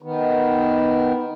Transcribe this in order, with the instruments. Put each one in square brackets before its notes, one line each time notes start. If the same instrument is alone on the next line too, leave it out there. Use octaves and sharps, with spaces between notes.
[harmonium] D#3 B3